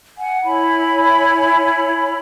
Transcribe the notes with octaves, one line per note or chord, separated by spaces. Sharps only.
F#5 G#5
E4 C#5 G#5 B5